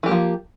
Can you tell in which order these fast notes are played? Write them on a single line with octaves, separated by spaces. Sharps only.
E3 G4 A#3 F3